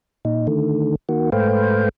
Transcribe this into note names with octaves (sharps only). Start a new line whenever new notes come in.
A#2 D#4
D3 D#3 A3
D#3 A#3 F#4
G#2 A3 B4 C5 F5 G5